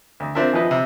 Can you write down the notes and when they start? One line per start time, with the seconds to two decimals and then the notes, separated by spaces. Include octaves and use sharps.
0.20 D2
0.35 C4 D4 F4 A#4 E5
0.53 G#1 F3 E4 B4 D#5
0.71 C3